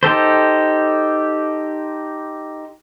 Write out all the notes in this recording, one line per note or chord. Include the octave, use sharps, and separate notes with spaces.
D#4 G4 A4 C5